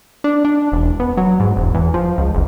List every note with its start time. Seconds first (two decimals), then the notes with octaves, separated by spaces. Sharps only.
0.24 D4
0.45 D4
0.72 E1
1.00 B3
1.17 F#3
1.40 G#2
1.57 E1
1.74 E2
1.94 F3
2.18 C#2
2.35 F#1